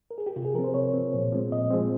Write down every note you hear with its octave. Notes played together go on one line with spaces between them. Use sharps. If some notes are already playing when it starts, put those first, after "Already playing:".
A#4
G#4
G4
C3 F4
G#4
F3 C4 A#4
C5
C3 C#5
F3 C4
A#2
F3 G#3 C4
A#2 D#5
F3 G#3 C4